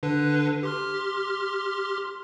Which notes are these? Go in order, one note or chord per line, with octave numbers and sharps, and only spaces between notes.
D3 D4 B4
G4 C6 F6